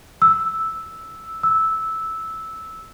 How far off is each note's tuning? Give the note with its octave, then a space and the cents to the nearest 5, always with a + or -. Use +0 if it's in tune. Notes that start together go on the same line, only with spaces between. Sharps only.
E6 -5
E6 -10